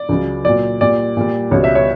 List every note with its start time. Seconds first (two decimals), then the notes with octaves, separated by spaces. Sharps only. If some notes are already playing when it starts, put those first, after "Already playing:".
Already playing: D5
0.09 C#2 C#3 F#3
0.45 A#2 F#3 D5
0.81 A#2 G3 D5
1.17 A#2 G3
1.51 C#2 B2 G3 C#5
1.64 E5
1.75 C#5